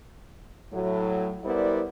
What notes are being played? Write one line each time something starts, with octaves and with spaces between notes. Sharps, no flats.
A2 F#3
G3 B3 E4 A#4 C5 D5